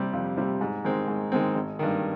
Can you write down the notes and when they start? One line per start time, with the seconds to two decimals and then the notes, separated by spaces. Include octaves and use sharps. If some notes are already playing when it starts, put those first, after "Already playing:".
Already playing: C3 G3
0.13 F2
0.37 C3 G3
0.61 G#2
0.84 D#3 G#3 C4
1.08 G#2
1.32 D#3 G#3 C4
1.55 G#1
1.79 G2 D#3